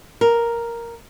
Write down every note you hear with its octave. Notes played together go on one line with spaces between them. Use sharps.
A#4